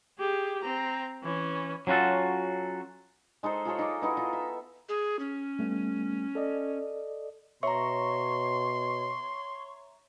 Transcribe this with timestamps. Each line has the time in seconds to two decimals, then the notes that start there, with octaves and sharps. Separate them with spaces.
0.19 G4 G#4
0.63 C4 A#5
1.23 E3 C#4
1.87 F#3 C#4 F4 F#4 A4
3.43 G#3 D#4 A4 C5
3.65 F4 G#4 A4 C#5
3.79 D#4 D6
4.02 B3 D#4 E4 F#4
4.17 D#4 F4
4.33 E5
4.89 G#4
5.19 C#4
5.59 G3 A3 B3
6.35 A4 D5 D#5
7.63 B2 C#5 E5 A#5 C6 C#6